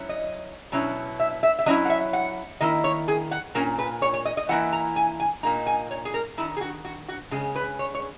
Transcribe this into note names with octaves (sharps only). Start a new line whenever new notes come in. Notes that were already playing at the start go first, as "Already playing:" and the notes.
Already playing: F#3 C#4 E4
D#5
B2 F#3 C#4 E4
E5
E5
E5
F#3 C#4 E4 D#5
F#5
E5
F#5
D#3 A#3 E4 D#5
C#5
G#4
F#5
A#2 A#3 C#4 A#4
B4
C#5
C#5
D#5
D#5
E3 A#3 E4 F#5
A#5
G#5
G#5
A#2 A#3 D#4 A#5
G#5
C#5
G#4
A#4
D#3 G#3 D#4 E4
G#4
F#4
F#4
F#4
C#3 G#3 C#4 G#4
B4
C#5
C#5